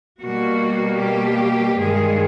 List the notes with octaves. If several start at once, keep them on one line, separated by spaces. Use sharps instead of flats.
B2 G3 A#3 F#4
G4
G2 D#3 G#3 G#4